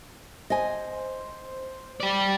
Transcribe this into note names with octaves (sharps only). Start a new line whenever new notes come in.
C5 D#5 G#5
G4 D5